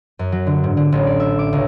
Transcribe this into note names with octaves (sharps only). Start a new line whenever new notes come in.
F#2
F#3
D3
G#2
D3
A1
D5
E5
D6
C#2